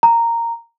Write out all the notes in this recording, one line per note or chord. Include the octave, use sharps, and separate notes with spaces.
A#5